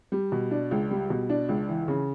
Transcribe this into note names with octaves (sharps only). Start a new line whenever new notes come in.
G3
B2
D4
C#2
G3
B2
D4
C#2
E3
C#3